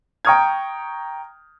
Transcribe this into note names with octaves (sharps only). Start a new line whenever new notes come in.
G5 A#5 C#6 D#6 F6 G#6